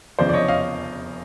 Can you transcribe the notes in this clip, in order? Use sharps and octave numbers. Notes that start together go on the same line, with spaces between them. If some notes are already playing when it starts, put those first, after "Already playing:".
F1 E2 C#3 F3 C5 D5
D5
C#5 D#5
D#5 F5